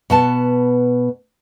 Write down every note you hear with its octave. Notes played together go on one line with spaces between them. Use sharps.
B2 B3 A5